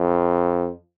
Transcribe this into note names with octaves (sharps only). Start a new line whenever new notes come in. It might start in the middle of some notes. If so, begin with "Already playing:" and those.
Already playing: F2